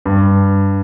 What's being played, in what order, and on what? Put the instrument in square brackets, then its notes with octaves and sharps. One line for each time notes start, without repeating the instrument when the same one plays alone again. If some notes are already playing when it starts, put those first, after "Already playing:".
[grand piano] G2